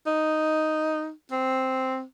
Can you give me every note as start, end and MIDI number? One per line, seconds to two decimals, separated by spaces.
0.07 1.11 63
1.32 2.03 60